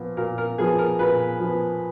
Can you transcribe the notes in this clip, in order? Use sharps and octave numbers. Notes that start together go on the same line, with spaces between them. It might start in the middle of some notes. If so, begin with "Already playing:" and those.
Already playing: A#2 F3 B3
A#2 A#4
A#4
F3 B3 G#4
A#4
A#2 B4
F3
B3